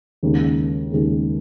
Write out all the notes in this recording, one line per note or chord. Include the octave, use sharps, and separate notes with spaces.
D#2 C#3 G#3
D#2 C#3 G#3